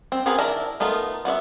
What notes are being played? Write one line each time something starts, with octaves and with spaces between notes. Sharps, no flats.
C4
C4 F#4 G#4 A#4 B4
D#3 D4 E4 A#4 A#5
A3 B3 D#4 F4 A#4
B3 F#4 D5 E5